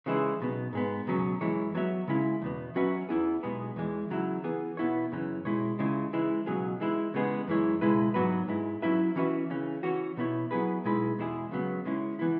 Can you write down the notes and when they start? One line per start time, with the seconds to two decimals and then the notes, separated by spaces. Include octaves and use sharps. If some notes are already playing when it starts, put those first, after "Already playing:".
0.06 C#3 E3 G#3 E4 G#4
0.40 B1 B2 B3
0.73 G#2 G#3 B3
1.07 C#2 B2 F#3 C#4
1.41 F#2 E3 G#3 E4 C#5
1.75 F#3 B3 F#4 C#5 E5
2.08 C#3 G#3 C#4 E4
2.42 E2 B2 B3
2.75 F#3 C#4 F#4 B4 E5
3.09 E2 E3 B3 E4 G#4
3.43 B1 B2 G#3 B3 G#4
3.76 E2 E3 G#3
4.10 C#3 F#3 E4
4.44 E3 B3 G#4
4.77 B2 B3 E4 C#5
5.12 F#2 C#3 E3 C#4
5.45 B2 G#3 E4 C#5
5.79 C#2 C#3 G#3 E4
6.13 E3 G#3 E4
6.46 C#2 B2 F#3 C#4 G#4
6.80 E3 G#3 E4
7.14 C#3 E3 G#3 B3 G#4
7.47 F#2 E3 G#3 E4 C#5
7.81 C#2 B2 G#3 E4 B4
8.14 G#2 F#3 B3 F#4 B4
8.48 G#2 G#3 E4
8.82 F#3 C#4 E4 B4 E5
9.16 E3 C#4 F#4 B4 E5
9.50 C#3 E3 C#4
9.83 E3 C#4 F#4 C#5
10.17 B2 B3 E4 C#5
10.51 F#3 B3 E4 G#4 B4
10.85 B1 B2 G#3 E4 B4
11.18 E2 B2 G#3 E4 G#4
11.51 C#2 C#3 F#3 B3
11.85 C#3 G#3 C#4 E4
12.19 E3 B3 E4